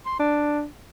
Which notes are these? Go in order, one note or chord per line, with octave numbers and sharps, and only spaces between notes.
C6
D4